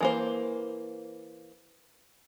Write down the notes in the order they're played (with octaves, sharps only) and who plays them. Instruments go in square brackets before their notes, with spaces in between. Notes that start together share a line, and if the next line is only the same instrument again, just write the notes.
[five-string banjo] E3 A#3 C5